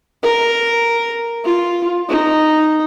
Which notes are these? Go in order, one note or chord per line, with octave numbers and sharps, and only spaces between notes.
A#4
F4
D#4